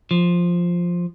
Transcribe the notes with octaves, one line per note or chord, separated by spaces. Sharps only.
F3